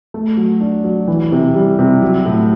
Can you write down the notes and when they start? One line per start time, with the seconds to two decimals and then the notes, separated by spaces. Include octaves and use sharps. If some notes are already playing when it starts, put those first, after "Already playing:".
0.14 A3
0.37 F#3
0.61 D4
0.84 F#3
1.07 E3
1.32 C3
1.55 G3
1.79 C3
2.02 F#3
2.26 A2